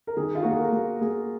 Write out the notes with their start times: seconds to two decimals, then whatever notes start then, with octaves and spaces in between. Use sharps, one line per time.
0.07 A#4
0.17 D#3 G#4
0.35 F4
0.43 A#3 F#4
0.51 G#4
0.58 A#4
0.72 A#3
1.01 A#3 G#4